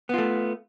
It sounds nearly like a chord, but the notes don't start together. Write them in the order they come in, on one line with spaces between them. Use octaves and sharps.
B3 F4 A3